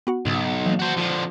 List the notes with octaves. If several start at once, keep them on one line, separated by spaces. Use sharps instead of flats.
B3 F#4 F#5
B1 G#2 C#3
E3 F#3 A#3
F#4 C5
D3 F3